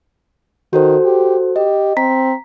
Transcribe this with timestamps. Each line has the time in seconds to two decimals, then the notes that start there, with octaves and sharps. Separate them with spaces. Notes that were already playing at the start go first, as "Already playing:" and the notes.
0.73 D#3 F#4 A4 C5
1.04 G4
1.56 G4 D#5
1.97 C4 A#5 B6